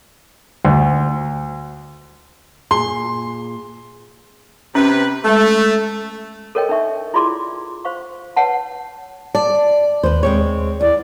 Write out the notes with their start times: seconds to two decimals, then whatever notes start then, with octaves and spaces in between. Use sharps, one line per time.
0.65 D2
2.71 A#2 G#4 C6
4.75 C3 C#4 B4
5.25 G#3 A3 A5
6.55 A4 A#4 C#5 D#5 G5
6.69 D4 D#4 E5 C#6
7.14 E4 F4 G#4 D5 C6 D6
7.85 C5 F5 C#6
8.36 B4 C#5 F#5 A5
9.35 D5 A5
10.03 D#2 B4 C5
10.23 G#3 C4 C#5
10.81 E2 D5